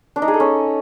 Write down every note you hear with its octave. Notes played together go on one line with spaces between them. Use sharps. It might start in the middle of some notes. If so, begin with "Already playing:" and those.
D4
D#4
G#4
A4
C#4